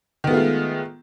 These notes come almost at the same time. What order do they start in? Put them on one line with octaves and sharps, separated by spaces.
D#3 B3 A3 F4 G#3